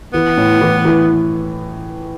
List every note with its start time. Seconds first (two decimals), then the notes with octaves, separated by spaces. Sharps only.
0.13 E3 B3
0.37 A2
0.61 E3
0.85 E3